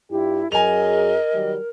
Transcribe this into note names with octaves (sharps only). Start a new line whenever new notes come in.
G2 E4 F4 G4
F#2 F#3 G#4 A#4 D#5 G#5 F7
D#3 F#3 G3